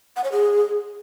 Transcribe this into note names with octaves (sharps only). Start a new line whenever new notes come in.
F#5
C#5
G#4